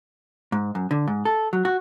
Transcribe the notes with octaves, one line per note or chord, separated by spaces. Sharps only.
G#2
F#2
D3
G#2
A4
F#3
F#4